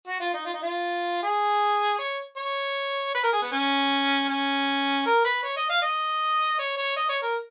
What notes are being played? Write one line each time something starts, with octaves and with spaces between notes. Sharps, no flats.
F#4
F4
D#4
F4
D#4
F4
G#4
C#5
C#5
B4
A#4
G#4
B3
C#4
C#4
A#4
B4
C#5
D#5
F5
D#5
C#5
C#5
D#5
C#5
A#4